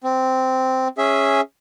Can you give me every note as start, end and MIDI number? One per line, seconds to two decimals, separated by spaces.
0.04 0.88 60
0.98 1.41 61
0.98 1.41 68
0.98 1.41 76